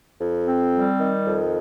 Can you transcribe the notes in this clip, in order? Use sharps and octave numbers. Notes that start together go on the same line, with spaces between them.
F2
C4
G3
D#3
F2